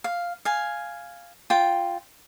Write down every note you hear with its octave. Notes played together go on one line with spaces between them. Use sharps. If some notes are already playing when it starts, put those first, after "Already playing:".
F5
F5 G#5
F4 G5